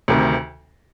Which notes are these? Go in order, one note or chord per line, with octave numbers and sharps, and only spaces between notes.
D2 C3 D#3